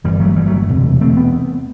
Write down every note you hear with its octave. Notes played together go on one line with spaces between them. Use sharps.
G1 G2 D3 E3 G3
F#3 A3
E3 G3
F#3 A3
E1 D2 C3
A3 C4
B3